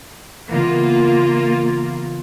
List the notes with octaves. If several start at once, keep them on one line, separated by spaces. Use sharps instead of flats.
C#3 E3 A#3 B3 F4